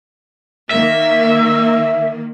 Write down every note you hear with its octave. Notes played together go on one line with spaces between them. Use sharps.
D#3 A#3 E5